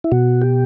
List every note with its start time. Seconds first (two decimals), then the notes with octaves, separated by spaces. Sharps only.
0.04 E4
0.12 B2 F#4
0.42 G4